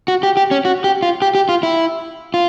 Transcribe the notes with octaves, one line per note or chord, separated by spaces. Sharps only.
F#4
G4
G4
C#4
F#4
G4
F4
G4
G4
F4
E4
F4